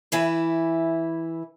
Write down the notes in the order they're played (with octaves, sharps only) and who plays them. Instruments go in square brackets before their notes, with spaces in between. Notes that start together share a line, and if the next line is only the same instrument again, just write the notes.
[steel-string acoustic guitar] E3 E4 B4